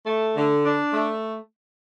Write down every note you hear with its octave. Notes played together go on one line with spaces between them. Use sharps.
A3
D3
D4
A3